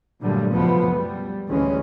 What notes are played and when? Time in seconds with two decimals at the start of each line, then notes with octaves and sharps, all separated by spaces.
0.20 G2 A#2 D3 F#3 G3 A3
0.51 C#2 F#2 B2 F3 A3 B3
0.93 G3
1.47 A1 D2 E3 G#3 C#4